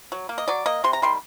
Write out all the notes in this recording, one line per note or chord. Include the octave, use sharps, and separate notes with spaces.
F#3
A#3
D#5
F#3 D5
A#3 D#5
C3 C6
A#5
D#3 G3 C6